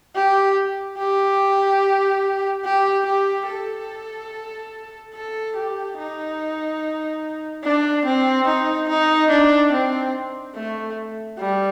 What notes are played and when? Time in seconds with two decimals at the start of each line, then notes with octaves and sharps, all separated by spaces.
0.16 G4
0.98 G4
2.65 G4
3.06 G4
3.48 A4
5.15 A4
5.57 G4
5.98 D#4
7.64 D4
8.05 C4
8.48 D#4
8.89 D#4
9.31 D4
9.72 C4
10.55 A3
11.39 G3